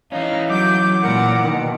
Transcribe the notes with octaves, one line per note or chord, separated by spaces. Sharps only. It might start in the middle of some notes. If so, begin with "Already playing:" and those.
E3 C#4 D#4 F5
F#3 D6 G6
A#2 A#4 F#5
B2 D#3